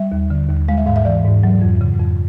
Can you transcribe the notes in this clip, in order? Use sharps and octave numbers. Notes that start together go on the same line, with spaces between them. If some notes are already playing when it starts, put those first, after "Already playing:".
Already playing: G3 E5
D#2
D3
D#2
G#3 F5
E5
G#2 F5
E5
E3 D5
G#2
F#3
F2
C#3
F2